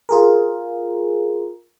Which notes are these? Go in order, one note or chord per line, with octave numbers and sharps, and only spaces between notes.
F4 G#4 A#4